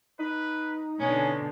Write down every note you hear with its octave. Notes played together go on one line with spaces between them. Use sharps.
D#4 B4
B2 D3 G#3 C#4